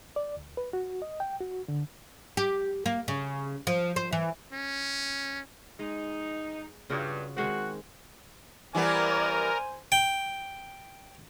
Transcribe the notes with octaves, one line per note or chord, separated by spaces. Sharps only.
D5
D2
B4
F#4
D#5
G5
F#4
D3
G4
A#3
C#3
F3
C5
E3
C#4
G#3 D#4
G2 C#3 F4 F#4
D#3 G#3 C4 F#4
E3 G3 B3 A#4 C5 D5 G#5
G5